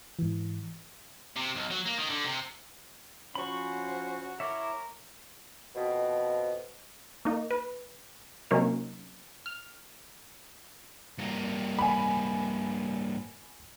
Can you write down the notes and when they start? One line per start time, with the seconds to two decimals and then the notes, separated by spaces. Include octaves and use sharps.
0.19 G#2 E3
1.36 C3
1.56 B1
1.71 F#3
1.86 A#3
1.98 D#3
2.10 D3
2.25 C3
3.35 F3 C#4 F#4 C5 B5 C#6
4.40 E4 A#4 C#5 E5 D6
5.76 F2 B2
7.25 A#3 D#4
7.51 B4
8.51 C3 F#3 A#3 C#4 D#4 A#4
9.46 F6
11.18 G2 A#3
11.79 G#5 B5